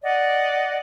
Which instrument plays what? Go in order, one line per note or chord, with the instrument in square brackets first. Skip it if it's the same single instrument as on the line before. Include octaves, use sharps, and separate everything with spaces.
[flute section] D5 D#5 F#5